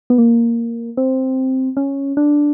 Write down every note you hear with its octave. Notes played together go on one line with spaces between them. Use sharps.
B3
A#3
C4
C#4
D4